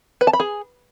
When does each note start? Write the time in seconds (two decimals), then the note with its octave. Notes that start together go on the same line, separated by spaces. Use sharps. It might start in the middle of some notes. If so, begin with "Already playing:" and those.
0.21 B4
0.27 A5
0.33 B5
0.40 G#4